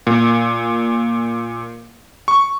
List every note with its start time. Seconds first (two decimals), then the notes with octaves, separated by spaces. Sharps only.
0.07 A#2
2.28 C#6